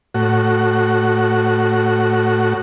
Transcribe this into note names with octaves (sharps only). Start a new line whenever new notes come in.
A2 F#4